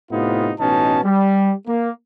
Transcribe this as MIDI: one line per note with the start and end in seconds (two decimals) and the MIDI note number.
0.11 0.52 45
0.11 0.52 48
0.11 0.52 59
0.11 0.52 63
0.11 0.52 65
0.60 1.00 33
0.60 1.00 47
0.60 1.00 61
0.60 1.00 63
0.60 1.00 81
1.04 1.53 55
1.68 1.90 58